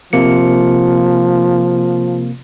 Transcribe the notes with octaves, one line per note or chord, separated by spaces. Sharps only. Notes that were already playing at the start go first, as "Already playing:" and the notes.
C3 F3 A#3 C#7